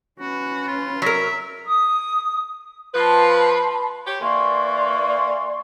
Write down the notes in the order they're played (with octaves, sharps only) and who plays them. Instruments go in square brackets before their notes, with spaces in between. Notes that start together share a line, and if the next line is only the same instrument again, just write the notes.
[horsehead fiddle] C#4 B4 [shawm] F#4
[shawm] F4
[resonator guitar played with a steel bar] F#3 A#4 [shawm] E5
[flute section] D#6
[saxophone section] F3 B4 [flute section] A5 B5 C6
[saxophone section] G4 C#5
[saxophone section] E3 A#3 [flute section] D5 C6 C#6